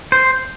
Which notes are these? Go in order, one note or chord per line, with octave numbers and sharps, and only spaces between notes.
C5